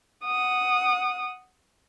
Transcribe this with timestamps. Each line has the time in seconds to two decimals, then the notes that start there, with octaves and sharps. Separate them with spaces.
0.25 F#5 D#6